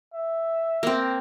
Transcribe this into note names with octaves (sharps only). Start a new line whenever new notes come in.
E5
A#3 C4